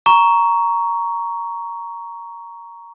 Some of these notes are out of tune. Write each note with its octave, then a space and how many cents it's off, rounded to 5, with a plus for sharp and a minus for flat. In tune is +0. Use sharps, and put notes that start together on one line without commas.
A#5 +0 C#6 +15